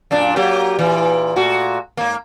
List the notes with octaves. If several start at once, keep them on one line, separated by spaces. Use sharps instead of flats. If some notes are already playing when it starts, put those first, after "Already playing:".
F#2 A#2 D4
F#3 A#3 G4
A#2 E3
A#2 A3 F#4
G#2 A#3